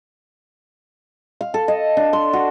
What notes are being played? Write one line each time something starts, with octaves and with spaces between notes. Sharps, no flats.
F5
A4
D#5
D4
C6
F#4